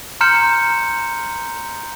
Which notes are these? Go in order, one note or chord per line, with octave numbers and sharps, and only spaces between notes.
A#5 C6 F6 G6 C#7 E7